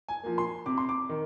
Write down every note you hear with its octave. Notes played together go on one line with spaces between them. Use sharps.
G#5
F3 A#3
C6
C3 D6
C6
D6
D#3